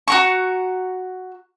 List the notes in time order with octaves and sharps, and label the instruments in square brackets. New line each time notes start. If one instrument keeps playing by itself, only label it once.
[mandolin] F#4 A#5 C#6